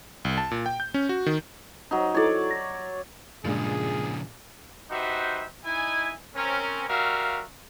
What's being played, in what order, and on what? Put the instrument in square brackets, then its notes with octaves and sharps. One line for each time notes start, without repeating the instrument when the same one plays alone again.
[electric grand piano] C2
A5
A#2
G5
G6
C#4
F#4
D#3
[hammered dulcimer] F#3 D#4
[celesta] E4 F#4 A4 [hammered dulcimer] C#5 D5
[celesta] A#6
[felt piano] G2 A#2 G#3 [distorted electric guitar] C#3 F3 [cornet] G#4
[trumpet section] D#4 F#4 G4 B4 C5 E5
D#4 E4 G#5
C4 C#4 A#4
G3 F#4 A#4 E5 F5